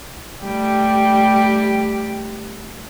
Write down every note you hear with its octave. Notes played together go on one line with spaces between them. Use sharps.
G3 A3 G4